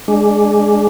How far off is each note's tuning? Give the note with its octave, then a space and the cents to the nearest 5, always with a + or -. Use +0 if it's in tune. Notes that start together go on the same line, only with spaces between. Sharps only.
G#3 +0 D4 +0